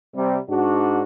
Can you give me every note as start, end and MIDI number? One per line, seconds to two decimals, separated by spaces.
0.14 0.37 48
0.14 0.37 55
0.48 1.02 44
0.48 1.02 62
0.48 1.02 66